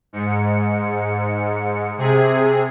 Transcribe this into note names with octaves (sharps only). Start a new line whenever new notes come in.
G#2 C#7
C3 G#4